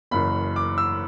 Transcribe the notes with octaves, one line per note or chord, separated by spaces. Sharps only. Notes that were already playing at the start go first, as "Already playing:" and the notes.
F#1 F#2 E3 B5
D6
E6